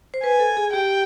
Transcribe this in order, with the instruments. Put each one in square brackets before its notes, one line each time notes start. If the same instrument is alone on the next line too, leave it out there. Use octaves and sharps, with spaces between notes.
[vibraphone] C5
[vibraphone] B4 [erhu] G#5
[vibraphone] A4
G#4
[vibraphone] G4 [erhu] G5